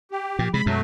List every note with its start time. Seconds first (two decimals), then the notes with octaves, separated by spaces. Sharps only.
0.11 G4
0.39 A#2 F3
0.54 C3 G#3 B5
0.66 F#2 B2 F#3 A3